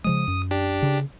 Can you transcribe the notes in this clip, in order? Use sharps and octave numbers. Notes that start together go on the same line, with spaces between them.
C#3 F3 G#3 D#6
F#2
D4 G4
C#3